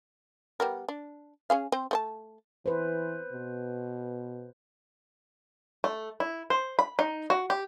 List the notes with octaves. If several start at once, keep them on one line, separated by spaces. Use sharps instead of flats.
G3 B3 A#4
D4
C#4 G#4 F5
C4 C5
A3 C5 A5
E3 B4 C5
B2
A3
E4
C5
B5
D#4
F#4
G4